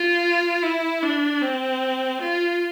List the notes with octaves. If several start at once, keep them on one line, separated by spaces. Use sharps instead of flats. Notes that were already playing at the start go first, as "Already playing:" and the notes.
Already playing: F4
E4
D4
C4
F4